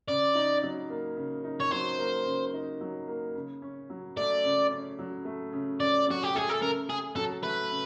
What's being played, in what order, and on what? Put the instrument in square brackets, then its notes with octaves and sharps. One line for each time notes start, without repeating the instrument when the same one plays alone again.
[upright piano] C#3 [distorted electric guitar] D5
[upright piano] D#4
F#3
A#3
C#3
D#4
[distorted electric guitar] C#5
[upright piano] F#3 [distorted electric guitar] C5
[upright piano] A#3
C#3
D#4
F#3
A#3
C#3
C#4
F#3
[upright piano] A3 [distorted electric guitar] D5
[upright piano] C#3
C#4
F#3
A3
C#3
[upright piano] C#4 [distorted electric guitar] D5
[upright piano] F#3 [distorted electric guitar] F#4
[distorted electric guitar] G4
[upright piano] A3 [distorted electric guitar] G#4
[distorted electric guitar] A4
[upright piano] C#3 [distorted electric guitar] A#4
[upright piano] C#3 [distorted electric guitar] G#4
[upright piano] F#3 [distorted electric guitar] A4
[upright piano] A3 [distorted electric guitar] B4
[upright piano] C#3